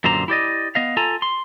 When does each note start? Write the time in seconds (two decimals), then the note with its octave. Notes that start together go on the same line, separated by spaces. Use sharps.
0.04 F#2 A#2 D3 C5 A#5
0.28 E4 G4 D5 D#5
0.75 B3 D#5 F5
0.97 F4 A4 G#5 A#5
1.22 C6